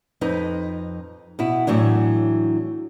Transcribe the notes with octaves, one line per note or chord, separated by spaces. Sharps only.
F2 D#4 B4
B2 E4
A2 E3 F#3 D4